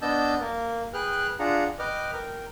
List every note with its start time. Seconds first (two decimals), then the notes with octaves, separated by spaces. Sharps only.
0.02 B3 D4 D#5 A5 E6 G6
0.41 A#3 A#4
0.94 G#4 B4 G5 F6 F#6
1.39 D4 F4 G#4 F#5 A#5
1.79 B4 D#5 G5 D6 F6
2.13 A#4 G5